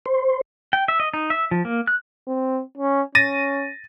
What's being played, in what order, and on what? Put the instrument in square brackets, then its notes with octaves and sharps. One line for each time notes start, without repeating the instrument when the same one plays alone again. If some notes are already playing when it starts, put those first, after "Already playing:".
[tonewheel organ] C5
[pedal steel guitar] G5
E5
D#5
D#4
E5
F3
A#3
F#6
[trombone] C4
C#4
[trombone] C#4 [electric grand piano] A6 A#6 D#7